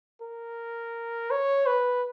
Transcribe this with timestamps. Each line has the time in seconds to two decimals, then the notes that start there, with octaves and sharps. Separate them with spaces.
0.21 A#4
1.31 C#5
1.66 B4